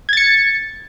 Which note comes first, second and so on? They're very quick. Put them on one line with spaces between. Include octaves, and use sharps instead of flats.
G#6 A6 C#7